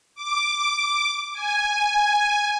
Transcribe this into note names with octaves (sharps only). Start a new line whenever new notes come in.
D6
G#5